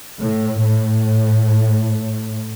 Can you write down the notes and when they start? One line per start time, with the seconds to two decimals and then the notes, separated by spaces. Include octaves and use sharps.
0.19 A2
0.61 A2